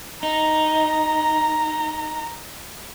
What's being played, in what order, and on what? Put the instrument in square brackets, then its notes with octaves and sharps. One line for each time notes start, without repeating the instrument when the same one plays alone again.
[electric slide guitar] D#4 [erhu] A#5